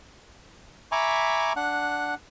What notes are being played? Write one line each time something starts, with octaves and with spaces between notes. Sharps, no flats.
E5 G#5 A#5 B5 C#6 D6
D4 F#5 F#6